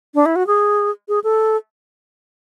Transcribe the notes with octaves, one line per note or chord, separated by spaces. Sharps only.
D4
E4
F#4
G#4
G#4
A4